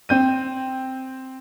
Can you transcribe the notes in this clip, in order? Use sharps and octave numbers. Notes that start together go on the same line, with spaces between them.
C4 G6 D#7